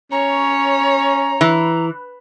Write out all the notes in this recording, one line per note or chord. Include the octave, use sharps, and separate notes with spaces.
C#4 C#5 A#5
E3